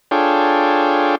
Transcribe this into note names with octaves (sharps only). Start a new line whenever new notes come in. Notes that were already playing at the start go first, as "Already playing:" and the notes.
D4 F4 G#4 A4 C#5 G5